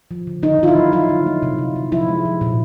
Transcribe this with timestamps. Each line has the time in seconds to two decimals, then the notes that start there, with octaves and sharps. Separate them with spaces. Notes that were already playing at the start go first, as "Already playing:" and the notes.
0.11 F3
0.27 D3
0.43 D3 D#4
0.59 D3 F4
0.68 E4
0.76 F#3
0.92 F#3 F4
1.09 D3
1.26 A#3
1.42 C3
1.58 C3
1.76 C3
1.92 F3 E4
2.08 G#3
2.25 F3
2.41 A#2